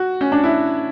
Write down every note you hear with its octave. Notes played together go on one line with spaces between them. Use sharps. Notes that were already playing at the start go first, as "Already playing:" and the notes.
Already playing: F#4
C#4
D4
E4